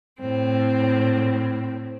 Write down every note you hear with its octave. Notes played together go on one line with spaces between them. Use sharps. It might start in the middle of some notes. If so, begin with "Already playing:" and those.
A2 C4